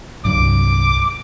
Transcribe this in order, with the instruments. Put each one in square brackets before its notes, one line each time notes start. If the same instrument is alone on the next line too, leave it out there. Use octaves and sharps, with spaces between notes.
[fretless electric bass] C2 G2 F#3 [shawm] D6